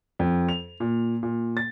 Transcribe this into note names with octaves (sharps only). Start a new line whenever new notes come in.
F2
F7
A#2
A#2
A6